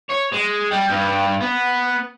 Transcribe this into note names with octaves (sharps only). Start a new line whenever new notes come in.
C#5
G#3
G3
G2
B3